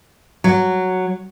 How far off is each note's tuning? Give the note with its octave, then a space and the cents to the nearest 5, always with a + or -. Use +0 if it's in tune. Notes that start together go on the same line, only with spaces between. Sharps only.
F#3 +0